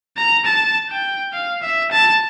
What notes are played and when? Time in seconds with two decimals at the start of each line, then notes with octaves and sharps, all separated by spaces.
0.17 A#5
0.45 A5
0.89 G5
1.33 F5
1.62 E5
1.91 A5